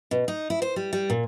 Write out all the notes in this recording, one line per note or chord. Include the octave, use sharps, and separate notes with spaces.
B2
D#4
E4
C5
G3
G3
A#2